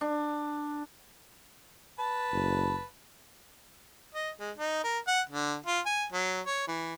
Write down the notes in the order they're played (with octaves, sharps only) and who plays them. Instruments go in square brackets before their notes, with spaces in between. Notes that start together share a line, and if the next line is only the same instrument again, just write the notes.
[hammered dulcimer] D4
[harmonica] B4 A5
[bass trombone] F#1
[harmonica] D#5
G#3
D#4
A#4
F#5
D3
F4
G#5
F#3
C#5
E3